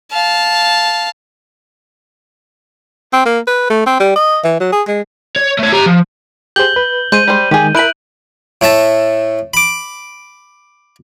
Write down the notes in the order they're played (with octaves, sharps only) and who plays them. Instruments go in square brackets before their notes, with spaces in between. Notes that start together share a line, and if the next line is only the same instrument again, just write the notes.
[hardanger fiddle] F5 A5
[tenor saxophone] C4
A#3
B4
A3
C4
G3
D#5
E3
F#3
G#4
G#3
[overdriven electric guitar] C#5
A3 C#5
G4 A#5
F3
[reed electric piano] G4 G#4 C5 [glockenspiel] G6 F#7 G7
[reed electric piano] B4
[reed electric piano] G#3 [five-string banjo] C5 [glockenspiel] G6 D#7
[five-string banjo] G3 C5
[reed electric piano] D#3 G#3 [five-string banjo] G4 G#4
[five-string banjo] E4 B5 [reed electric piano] A#4 [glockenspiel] F#6 D7 F#7
[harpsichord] A2 A3 E5 A5
B5 D6